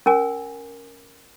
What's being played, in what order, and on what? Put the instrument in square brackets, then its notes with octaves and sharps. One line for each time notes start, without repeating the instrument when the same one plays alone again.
[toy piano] C#4 A#4 G#5